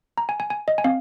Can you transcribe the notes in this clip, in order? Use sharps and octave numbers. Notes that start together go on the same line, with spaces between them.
A#5
G#5
G#5
G#5
D#5
G#5
C4 F5